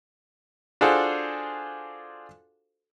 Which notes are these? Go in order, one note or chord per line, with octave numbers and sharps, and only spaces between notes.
D4 F4 F#4 G#4 A4 C5